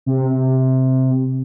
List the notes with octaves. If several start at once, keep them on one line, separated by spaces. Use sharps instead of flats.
C3